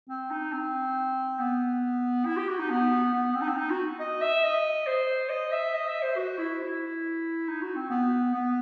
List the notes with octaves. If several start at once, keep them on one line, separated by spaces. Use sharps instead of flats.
C4
D#4
C4
B3
E4
G4
F#4
D#4
B3
B3
C4
D#4
C4
D#4
F#4
D#5
E5
D#5
C5
D#5
E5
D#5
E5
C5
F#4
E4
E4
D#4
F#4
C4
B3
B3